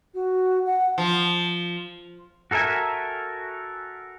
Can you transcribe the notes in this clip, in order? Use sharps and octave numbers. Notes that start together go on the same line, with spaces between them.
F#4
F#5
F3
F#4 A4 A#4 E5 G#5